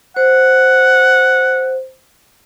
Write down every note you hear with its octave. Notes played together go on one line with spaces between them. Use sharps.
C5 F#5